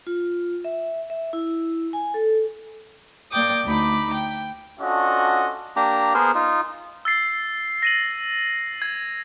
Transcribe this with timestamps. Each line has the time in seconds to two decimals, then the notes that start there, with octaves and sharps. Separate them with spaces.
0.07 F4
0.64 E5
1.10 E5
1.33 E4
1.93 G#5
2.14 A4
3.31 A#3 D5 G5 D6 D#6
3.65 D2 D#4 B5 D6
4.13 G5
4.80 C#4 D4 F4 F#4 A4 D#5
5.76 A#3 D4 G4 A#5
6.14 B3 G#4 A#4 C5
6.35 D#4 F4
7.05 E6 A6 C7
7.83 A#6 D#7 F#7
8.82 G#6